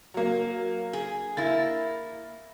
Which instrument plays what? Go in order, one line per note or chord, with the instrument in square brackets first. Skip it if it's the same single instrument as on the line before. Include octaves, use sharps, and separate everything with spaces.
[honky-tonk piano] F#3 A#3
[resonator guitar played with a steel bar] G#4
[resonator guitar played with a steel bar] A#3 E4 [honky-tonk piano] A6